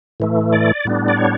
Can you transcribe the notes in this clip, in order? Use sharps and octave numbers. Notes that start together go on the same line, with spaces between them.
A2 E3 A3
D5
A2 G3 B3 D4
D5
C#5